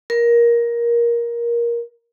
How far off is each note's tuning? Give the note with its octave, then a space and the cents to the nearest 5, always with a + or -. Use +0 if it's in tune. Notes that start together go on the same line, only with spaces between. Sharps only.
A#4 +15